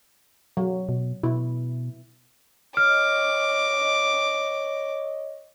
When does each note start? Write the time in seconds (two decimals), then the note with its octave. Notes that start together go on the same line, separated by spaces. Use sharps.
0.57 F#3
0.89 B2
1.23 B2 E4
2.77 C#5 D#5 D6 F6